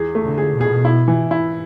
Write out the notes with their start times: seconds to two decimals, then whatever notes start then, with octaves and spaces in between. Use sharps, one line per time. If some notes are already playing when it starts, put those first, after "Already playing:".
Already playing: E2 G#4
0.15 A3
0.23 D3
0.38 G#4
0.53 B2
0.61 G#4
0.85 E4
1.08 E3
1.31 E4